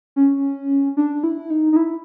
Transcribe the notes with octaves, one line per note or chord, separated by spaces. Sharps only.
C#4
D4
E4
D#4
D#4
E4